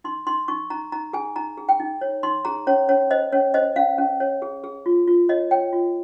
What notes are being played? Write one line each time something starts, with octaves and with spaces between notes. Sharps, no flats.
D#4 C6
D#4 C6
D#4 C#6
D#4 A#5
D#4 A#5
G#4 G#5
D#4 A#5
G#4
G5
D#4
C#5
D#4 C6
G#4 A#5
C#4 C#5
C#4 C#5
C5 D#5
C#4 C#5
C5 D#5
C#4 F5
C#4
C#5
G#4
G#4
F4
F4
C#5 D#5
C#5 G5
F4